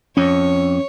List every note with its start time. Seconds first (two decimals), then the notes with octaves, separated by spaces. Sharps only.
0.17 F2 C#4 C#5